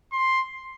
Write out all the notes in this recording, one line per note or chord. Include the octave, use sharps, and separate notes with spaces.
C6